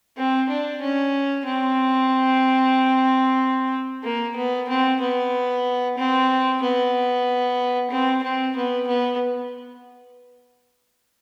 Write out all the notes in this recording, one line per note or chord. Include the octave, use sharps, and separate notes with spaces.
C4
D4
C#4
C4
A#3
B3
C4
B3
C4
B3
C4
C4
B3
B3